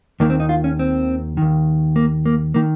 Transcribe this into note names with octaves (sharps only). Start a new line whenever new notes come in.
D#2 D#3 A#3
C4
D#4
F4
C#4
C4
D#2 D#3
A#3
A#3
D#3 A#3